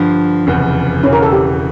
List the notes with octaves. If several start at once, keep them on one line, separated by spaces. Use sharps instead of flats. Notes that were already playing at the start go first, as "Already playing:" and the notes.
Already playing: G2 D3 F3
F1 E2 C#3 F3
E1 E2 C#3 E3 C#4
A#4
A4
G4